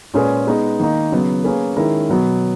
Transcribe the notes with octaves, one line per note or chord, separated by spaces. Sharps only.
A#2 G#3 C#4 G#4 B4
G#3 B3 D#4
D#3 A#3 D#4
C#3 F#3 B3
A#3 C#4 G#4 B4
D#3 G#3 C#4 E4 A#4
B2 F#3 B3